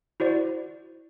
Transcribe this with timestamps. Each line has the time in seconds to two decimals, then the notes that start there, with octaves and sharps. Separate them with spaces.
0.20 E4 F#4 C5 D5